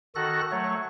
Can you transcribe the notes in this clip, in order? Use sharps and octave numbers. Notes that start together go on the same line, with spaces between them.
D#3 F#4 A4 F#6 A#6
F#3 A3 C#5